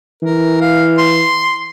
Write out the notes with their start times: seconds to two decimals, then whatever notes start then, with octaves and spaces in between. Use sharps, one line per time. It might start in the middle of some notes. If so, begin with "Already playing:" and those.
0.23 E3 A#4
0.61 F5
0.98 C6